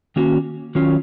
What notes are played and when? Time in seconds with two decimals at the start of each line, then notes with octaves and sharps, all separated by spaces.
0.16 D#3 A#3 C#4 F#4
0.75 D#3 F#3 C#4 F4